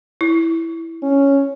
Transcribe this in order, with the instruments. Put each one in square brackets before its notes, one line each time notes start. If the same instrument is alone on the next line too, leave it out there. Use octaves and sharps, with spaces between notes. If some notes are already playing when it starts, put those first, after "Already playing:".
[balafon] E4
[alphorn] C#4